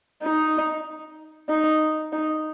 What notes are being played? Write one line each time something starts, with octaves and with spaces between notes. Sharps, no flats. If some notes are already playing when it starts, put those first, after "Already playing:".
D#4
D#4
D#4